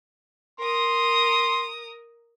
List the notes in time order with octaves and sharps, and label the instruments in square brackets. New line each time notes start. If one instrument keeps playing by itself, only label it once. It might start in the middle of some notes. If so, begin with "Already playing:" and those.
[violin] A#4 D#6 [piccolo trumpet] C6